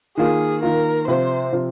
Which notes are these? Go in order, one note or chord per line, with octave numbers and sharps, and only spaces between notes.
D#3 A#3 F4 G#4
D#3 A#3 F4 A#4
C3 F3 C4 F4 C5
C3 F3 C4 F4